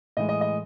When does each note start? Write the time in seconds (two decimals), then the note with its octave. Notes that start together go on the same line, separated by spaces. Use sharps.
0.17 A2 E3 G#3 D#5
0.29 D#5
0.41 D#5